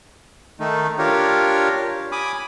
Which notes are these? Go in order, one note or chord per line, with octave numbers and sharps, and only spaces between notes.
D#3 A3 D#4
D4 F4 G4 A#4 C#5
G#5 B5 D6 D#6